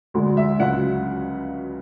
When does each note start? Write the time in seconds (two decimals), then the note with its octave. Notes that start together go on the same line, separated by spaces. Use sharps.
0.14 D2 D3 G#3
0.37 E5
0.59 C#2 C#3 F#3 F#5